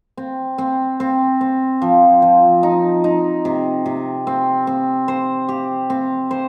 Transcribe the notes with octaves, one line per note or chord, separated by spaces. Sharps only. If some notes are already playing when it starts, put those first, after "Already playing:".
C4
C4
C4
C4
F3
F3
D#4
D#4
C3
C3
C4
C4
C5
G4
C4
C5